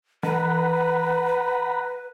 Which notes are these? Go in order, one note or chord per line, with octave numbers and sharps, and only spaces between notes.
E3 B4 F#5 A#5 B5